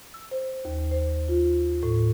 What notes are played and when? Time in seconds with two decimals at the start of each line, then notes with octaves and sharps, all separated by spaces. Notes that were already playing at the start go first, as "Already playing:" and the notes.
0.14 E6
0.31 C5
0.65 D#2
0.91 C5
1.28 F4
1.83 A2